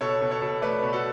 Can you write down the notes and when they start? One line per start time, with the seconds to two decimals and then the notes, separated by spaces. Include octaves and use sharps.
0.01 B2 A4 C#5
0.21 B2
0.31 A4 C#5
0.42 B2
0.62 A3 B4 D5
0.83 B2
0.93 F#4 A4